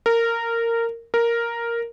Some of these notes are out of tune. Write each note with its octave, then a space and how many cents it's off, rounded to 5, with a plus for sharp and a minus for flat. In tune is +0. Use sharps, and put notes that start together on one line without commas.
A#4 -15
A#4 +0